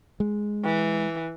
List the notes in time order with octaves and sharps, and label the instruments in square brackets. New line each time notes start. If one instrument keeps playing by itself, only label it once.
[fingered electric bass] G#3
[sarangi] E3